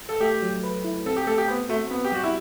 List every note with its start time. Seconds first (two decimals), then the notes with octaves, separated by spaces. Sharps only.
0.09 A4
0.20 A3 G4
0.42 F#3
0.63 B4
0.84 E4
1.06 C4 A4
1.16 G4
1.27 A3 A4
1.38 G4
1.48 B3 C5
1.69 A3 F#4
1.91 B3 C4
2.04 G4
2.12 G3 F#4
2.24 E4